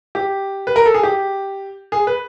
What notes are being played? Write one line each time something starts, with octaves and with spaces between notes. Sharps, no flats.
G4
B4
A#4
A4
G#4
G4
G#4
B4